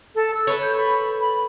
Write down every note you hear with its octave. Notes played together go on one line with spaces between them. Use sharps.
A4
E6
A4 B4 C#5
G6
B5
B5